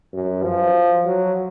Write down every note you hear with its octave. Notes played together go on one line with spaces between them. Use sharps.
F#2
F3
F#3